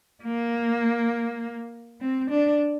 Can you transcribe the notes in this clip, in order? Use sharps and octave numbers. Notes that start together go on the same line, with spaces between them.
A#3
C4
D4